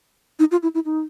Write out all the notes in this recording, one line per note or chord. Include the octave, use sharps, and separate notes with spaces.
D#4
F4
E4
E4
D#4